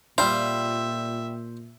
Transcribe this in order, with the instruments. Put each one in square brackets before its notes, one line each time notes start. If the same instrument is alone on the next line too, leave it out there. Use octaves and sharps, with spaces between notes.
[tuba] A#2 [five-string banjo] G3 F4 [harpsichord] C5 [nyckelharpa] E5